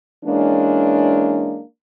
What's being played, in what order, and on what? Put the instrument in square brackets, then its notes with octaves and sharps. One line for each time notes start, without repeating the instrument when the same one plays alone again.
[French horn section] E3 G#3 A#3 C#4 D4